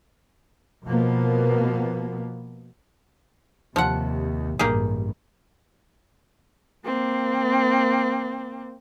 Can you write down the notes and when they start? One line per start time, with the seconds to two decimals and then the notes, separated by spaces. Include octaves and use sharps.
0.87 B2 F3 A#3 B3
3.76 D#2 C3 F3 F#5
4.59 A1 G2 A#3 G4 G#4
6.85 A#3 C4